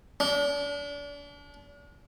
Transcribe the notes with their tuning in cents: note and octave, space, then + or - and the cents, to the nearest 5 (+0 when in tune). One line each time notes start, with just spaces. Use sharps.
D4 -35